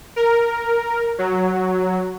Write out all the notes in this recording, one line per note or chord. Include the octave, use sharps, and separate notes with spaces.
A#4
F#3